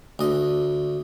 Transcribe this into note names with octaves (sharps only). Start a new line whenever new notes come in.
D2 D#5